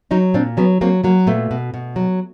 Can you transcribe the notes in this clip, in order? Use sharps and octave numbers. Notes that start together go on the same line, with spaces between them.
F#3 C#4 D#4
A#2 C4 D4
F#3 B3 C#4
F#3 A#3 C4
F#3 A#3
A#2 A3 B3
B2
B2
F#3